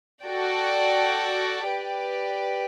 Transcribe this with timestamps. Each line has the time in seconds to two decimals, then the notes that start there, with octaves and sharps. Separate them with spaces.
0.23 F#4 A4 D5 G5
1.67 G4 B4 D5